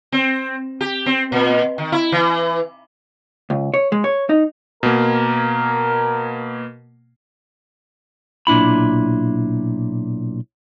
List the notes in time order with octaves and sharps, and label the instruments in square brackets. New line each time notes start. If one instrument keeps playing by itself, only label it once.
[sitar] C4
G4
C4
A#2
D#3
E4
E3
[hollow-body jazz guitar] C#2
C#5
G#3
C#5
D#4
[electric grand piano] B2 A#3 [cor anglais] A#4
[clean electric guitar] B1 A#2 D4 E4 B5